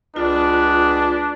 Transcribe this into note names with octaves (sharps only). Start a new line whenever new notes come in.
C#2 D4 F4 G#4 B4